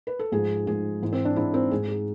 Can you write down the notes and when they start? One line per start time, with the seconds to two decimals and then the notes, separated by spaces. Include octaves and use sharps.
0.07 B4
0.19 A4
0.32 G#2 F3 G#3 G#4
0.67 G#2 F3 G#3 G#4
1.02 G#2 E3 G#3
1.13 C4
1.25 D4
1.36 G#2 E3 G#3 E4
1.54 C4
1.71 G#2 G#3 G#4
1.88 G#4